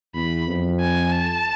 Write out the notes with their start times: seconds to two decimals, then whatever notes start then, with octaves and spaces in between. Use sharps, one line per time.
0.15 E2 B5
0.46 F2
0.80 G#5
1.12 A5